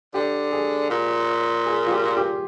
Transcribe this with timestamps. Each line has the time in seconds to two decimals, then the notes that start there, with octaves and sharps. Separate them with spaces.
0.14 D3 G4
0.52 G#4
0.90 A#2
1.66 G#4
1.87 F4
1.91 G4
2.17 G4